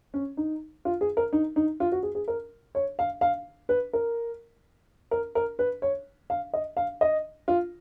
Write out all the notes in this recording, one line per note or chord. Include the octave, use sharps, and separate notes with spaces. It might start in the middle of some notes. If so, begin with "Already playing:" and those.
C#4
D#4
F4
G#4
A#4
D#4
D#4
F4
F#4
G#4
G#4
A#4
C#5
F5
F5
B4
A#4
A#4
A#4
B4
C#5
F5
D#5
F5
D#5
F4